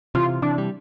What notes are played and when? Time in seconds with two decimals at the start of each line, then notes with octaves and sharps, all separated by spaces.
0.15 C3 E3 F4
0.42 C3 E3 D4
0.58 G3